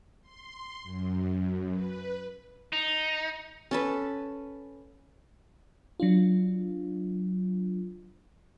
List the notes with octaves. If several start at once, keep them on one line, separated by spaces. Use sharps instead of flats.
C6
F#2
B4
D#4
C#4 A4 B4
F#3 D4 F4